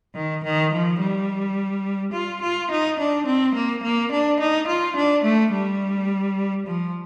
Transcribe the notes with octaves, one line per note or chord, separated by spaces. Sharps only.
D#3
D#3
F3
G3
F4
F4
D#4
D4
C4
A#3
A#3
D4
D#4
F4
D4
A3
G3
F3